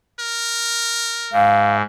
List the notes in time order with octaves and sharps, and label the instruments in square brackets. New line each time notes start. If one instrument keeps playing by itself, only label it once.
[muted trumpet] A#4
[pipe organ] G#2 [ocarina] F5